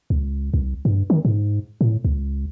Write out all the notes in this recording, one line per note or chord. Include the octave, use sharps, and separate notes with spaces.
C#2
C2
G2
D#3
G#2
A2
C#2